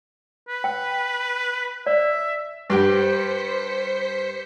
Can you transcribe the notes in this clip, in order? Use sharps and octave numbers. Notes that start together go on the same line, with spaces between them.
B4
G5
D5 E5
G2 G4 C5 G5 B6 C#7